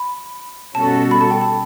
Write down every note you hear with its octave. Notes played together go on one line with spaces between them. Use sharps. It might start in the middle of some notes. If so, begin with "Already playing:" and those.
Already playing: B5
B2 G3 C#4 F#4 A4 A5
B5
A5
G5
A5